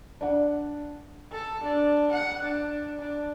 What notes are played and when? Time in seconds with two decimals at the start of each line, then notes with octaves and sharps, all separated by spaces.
0.21 D4 D5 F#5
1.32 A4
1.63 D4
2.11 F#5
2.43 D4
2.99 D4